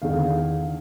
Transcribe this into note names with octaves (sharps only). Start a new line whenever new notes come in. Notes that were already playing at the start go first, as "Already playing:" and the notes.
E2 D3 D#3 F5